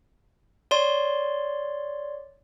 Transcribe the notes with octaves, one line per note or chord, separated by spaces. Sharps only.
C#5 D5 C6